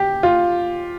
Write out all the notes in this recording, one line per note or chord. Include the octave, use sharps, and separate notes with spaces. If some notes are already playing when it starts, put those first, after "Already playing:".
Already playing: G4
F4